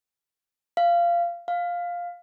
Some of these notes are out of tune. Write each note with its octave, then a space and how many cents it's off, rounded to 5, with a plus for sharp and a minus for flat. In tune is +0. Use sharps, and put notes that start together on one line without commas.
F5 -20
F5 +5